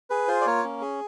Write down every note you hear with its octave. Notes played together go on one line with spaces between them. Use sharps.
G#4 B4
F4 C5
D5
A#3 C#5
C#4
G#4